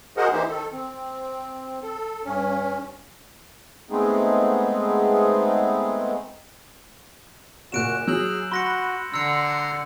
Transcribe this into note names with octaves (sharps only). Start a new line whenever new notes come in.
F#4 G#4 A#4 C5 D#5 F#5
E3 A#3 D#4 G4 C5
D#3 A4
C4
A4
G2 C#4
G#3 A3 B3 C4 D#4 G#4
F#1 A#2 F#4 F#6 D7 E7
F#3 G#4 E6 F6 G6 F#7
F#4 B5 C6 A#6 C#7
D3 A#5 C6 E6 C#7